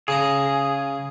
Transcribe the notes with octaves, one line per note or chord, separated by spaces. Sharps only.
C#3 G#4 A5 A#5